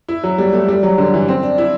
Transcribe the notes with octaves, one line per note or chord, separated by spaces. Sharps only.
E4
F#3
G3
A3
G3
F#3
D3
E3
C4
D4
E4